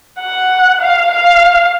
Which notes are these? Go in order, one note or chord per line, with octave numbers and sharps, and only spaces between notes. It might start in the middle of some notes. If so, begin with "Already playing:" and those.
F#5
F5
F5